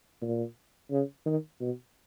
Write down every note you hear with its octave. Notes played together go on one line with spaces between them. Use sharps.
A#2
C#3
D#3
B2